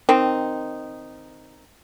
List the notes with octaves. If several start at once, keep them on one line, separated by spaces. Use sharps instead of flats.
D#3 C4 D#4